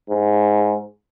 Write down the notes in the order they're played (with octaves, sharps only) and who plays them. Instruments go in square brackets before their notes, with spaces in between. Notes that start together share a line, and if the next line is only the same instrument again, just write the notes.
[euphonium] G#2